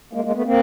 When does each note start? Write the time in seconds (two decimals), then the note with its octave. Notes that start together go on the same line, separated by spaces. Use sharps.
0.13 G#3 A#3
0.24 G#3 A#3
0.35 A3 B3
0.45 A#3 C4